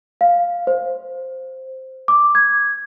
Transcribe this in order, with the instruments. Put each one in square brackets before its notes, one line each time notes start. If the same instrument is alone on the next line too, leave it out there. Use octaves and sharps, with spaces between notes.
[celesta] F5
C5
D6
G#6